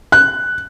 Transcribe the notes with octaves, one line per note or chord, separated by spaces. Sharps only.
F#6